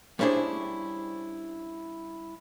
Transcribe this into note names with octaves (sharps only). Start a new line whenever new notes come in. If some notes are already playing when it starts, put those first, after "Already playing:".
G3 C#4 D4 E4 G#4 C5